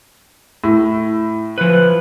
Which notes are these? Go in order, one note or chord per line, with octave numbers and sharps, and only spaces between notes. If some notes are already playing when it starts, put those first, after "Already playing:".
A2
F3 B4